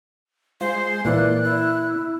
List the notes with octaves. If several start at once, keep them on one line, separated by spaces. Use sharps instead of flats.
G#3 F4 C5
A#2 E3 A#3 D5 F#6
E4